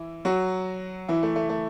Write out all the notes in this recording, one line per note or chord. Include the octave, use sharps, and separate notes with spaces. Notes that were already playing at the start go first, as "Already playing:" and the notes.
Already playing: E3 E4
F#3 F#4
E3 E4
A3
A3
A3